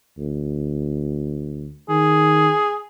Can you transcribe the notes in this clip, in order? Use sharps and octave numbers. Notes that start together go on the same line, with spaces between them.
D2
D#3 G#4